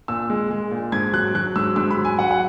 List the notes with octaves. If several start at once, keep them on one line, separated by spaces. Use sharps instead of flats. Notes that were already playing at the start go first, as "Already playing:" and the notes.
A#2 E6
G#3
G#3
A#2
G#2 G#6
F#3 F#6
F#3 F#6
G#2 E6
G#2 E6
B5
F#3
G#5
F#3 F#5
F#5